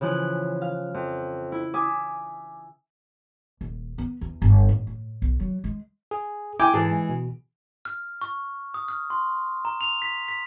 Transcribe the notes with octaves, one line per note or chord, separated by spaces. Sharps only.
C#3 E3 F3 F#6
F5
F2
E4
E5 G#5 D6 D#6
D#1
B3
E2
G1
A1
A2
B1
F#3
G#3
G#4
E4 G5 G#5 D6
G#2 E3 G#4 A5
G#3
B2
F6
C#6
D#6
F6
C6
A#5
F7
B6
B6